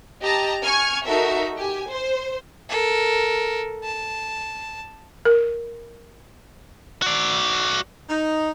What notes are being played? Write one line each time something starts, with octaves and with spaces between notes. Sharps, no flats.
G4 D#5 A5 A#5
G#5 C#6 F6 G#6
D#4 F#4 A4 A#4 E5
G4 G#5
C5
A4 A#4
A5
A#4
F#4 D5
D#4